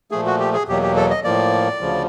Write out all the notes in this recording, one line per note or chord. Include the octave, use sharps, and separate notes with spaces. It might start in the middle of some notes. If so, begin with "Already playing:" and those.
A#2 F3 A3 G#4
F#4
G4
G#4
E2 B2 F#3 A#3 G4
G4
A4
D#5
A2 F3 A#3 D5
D2 C#3 F3